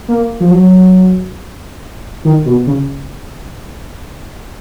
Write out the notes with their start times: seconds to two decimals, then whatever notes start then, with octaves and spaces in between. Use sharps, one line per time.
0.08 A#3
0.40 F3
0.51 F#3
2.25 D#3
2.46 B2
2.67 C#3